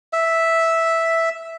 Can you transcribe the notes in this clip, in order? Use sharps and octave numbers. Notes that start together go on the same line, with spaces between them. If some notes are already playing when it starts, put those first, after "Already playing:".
E5